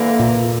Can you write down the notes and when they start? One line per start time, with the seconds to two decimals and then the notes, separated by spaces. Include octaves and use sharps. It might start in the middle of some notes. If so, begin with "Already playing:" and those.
Already playing: D3 E3 A#3
0.20 A#2